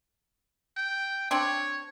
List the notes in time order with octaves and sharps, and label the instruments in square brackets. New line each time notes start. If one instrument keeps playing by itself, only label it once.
[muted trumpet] G5
[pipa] C4 D4 [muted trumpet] C#5